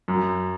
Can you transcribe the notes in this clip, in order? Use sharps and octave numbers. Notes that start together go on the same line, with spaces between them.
F#2